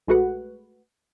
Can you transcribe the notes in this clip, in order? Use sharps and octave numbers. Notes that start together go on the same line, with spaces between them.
A#1 G#3 A3 F#4 B4 F#5